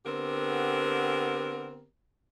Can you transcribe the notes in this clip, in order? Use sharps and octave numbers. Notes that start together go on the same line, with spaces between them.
D3 B3 C4 G4 A#4